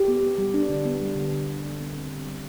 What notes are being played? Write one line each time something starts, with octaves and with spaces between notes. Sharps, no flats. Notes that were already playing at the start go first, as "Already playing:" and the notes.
Already playing: G4
B3
B3
G3
D4
D3
B3
G3
D3
D3
D3
B3
B3
C4
D3
G3